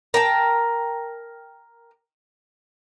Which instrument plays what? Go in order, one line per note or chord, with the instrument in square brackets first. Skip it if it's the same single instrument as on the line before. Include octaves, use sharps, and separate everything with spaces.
[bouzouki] A#4 G5 A5